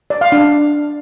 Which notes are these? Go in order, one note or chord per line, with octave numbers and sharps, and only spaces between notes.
D5
F5
D4